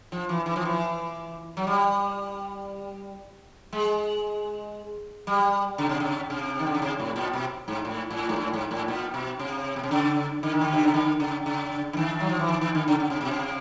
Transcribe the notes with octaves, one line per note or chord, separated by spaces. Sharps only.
F3
E3
E3
F3
E3
F#3
G3
G#3
G3
C#3
C3
C#3
C3
D#3
D3
C#3
C3
A2
A#2
B2
G#2
A2
A2
G#2
A2
G#2
A2
A#2
B2
C3
B2
C3
C#3
D3
D#3
D3
C3
C#3
D3
C#3
C#3
D3
D#3
F#3
F3
E3
D#3
D#3
D3
C#3
C#3
C3
B2
C3